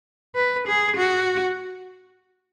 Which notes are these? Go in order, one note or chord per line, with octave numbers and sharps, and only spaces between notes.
B4
G#4
F#4